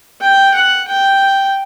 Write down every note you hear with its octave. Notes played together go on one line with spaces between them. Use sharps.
G5
F#5
G5